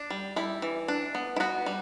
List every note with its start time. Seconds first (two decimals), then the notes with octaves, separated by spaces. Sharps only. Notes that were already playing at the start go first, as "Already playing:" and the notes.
Already playing: D4
0.10 G3
0.36 G3 E4
0.62 E3
0.88 D4
1.15 B3
1.36 E4
1.40 B3 F#4
1.66 G3